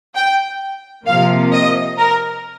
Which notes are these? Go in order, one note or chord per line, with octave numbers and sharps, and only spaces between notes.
G5
C3 F3 A#3 F5
D#5
A#4